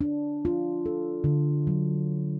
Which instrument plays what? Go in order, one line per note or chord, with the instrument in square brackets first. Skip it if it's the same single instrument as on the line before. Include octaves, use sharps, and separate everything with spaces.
[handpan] D4
F4
A4
D3
F#3